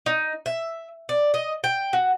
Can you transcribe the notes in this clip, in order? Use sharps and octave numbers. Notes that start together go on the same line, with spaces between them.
D#4
E5
D5
D#5
G5
F#4